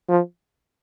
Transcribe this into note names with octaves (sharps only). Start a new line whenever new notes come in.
F3